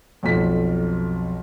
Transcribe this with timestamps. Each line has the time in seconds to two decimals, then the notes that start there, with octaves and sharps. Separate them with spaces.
0.23 B1 F2 B6